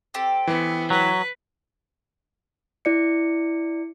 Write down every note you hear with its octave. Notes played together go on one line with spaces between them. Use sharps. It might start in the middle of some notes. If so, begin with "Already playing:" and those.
C4 G4 A4
E3 B3
F#3 B4
E4 D5 C#7